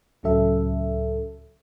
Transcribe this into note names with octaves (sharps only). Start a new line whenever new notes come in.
C#2 A2 F#3 C#4 A4 E5